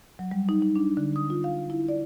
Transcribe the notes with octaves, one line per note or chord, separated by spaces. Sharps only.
F#3
G3
D#4
D#4
D4
D3
D#6
F4
F5
E4
D5